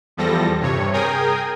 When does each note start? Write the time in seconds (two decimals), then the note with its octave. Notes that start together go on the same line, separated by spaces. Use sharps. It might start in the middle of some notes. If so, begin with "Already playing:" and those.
0.17 E2 F3 G3 A4 A#6
0.60 G2 C3 C#5
0.93 G#4 A#4 G5 G#5 A#5 D#6